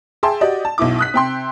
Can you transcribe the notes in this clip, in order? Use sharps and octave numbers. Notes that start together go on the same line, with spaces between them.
G#4 E5 G5 A5 C6
F#4 G4 D5 D#5
A5
B1 B2 E4 D6
D#6 F#6 B6
C3 G5 C6